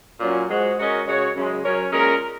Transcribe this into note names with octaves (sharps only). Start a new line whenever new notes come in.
A#2 F#3 C#4
G#2 G#3 F#4
G#3 C#4 F#4 A#4 D#5
C#3 G#3 F#4 C#5
F#2 C#3 G#3
F#3 C#4 A#4 C#5
A#2 G#3 C#4 A#4